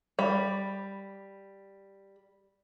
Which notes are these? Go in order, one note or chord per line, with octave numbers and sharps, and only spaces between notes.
G3 B5